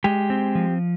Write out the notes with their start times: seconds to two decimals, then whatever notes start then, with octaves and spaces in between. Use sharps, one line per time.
0.04 G#3 G4
0.30 C4
0.55 F3